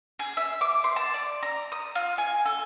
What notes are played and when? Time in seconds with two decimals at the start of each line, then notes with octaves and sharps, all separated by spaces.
0.19 G#4
0.37 E5
0.61 D6
0.84 C6
0.96 A5
1.14 D5
1.43 A#5
1.72 D#6
1.95 F4
2.18 G#5
2.46 A4